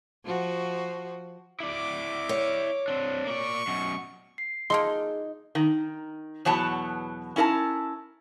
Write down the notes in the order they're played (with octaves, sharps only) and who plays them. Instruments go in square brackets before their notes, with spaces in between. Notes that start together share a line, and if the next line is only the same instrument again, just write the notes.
[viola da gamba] F3 F#4
[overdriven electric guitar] E4 D5 [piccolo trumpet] D6
[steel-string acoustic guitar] C#5
[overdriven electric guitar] C4 D4
[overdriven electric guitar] A#3 D5 [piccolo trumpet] C#6
[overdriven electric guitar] F#2 B2
[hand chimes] C7
[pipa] A#3 A4 C6 [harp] D#4 [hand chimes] G#4
[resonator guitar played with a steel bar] D#3
E2 B2 F#3 B3 C#5 A5
C#4 E4 A#4 D#5 A5